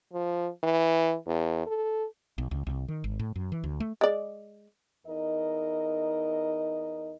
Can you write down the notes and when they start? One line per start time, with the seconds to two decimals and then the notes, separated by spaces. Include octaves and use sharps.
0.13 F3
0.63 E3
1.26 E2
1.67 A4
2.38 B1
2.51 C#2
2.67 C2
2.88 D#3
3.04 G#1
3.19 A2
3.36 F#2
3.52 E3
3.64 D2
3.80 A3
4.01 G#3 D5
5.06 E2 D#4 A#4 D#5